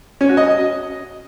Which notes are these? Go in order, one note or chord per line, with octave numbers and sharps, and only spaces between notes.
C#4
F#4
D#5